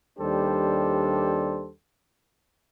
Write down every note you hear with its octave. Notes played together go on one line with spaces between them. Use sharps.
D#2 G3 D4 G4 A4 C5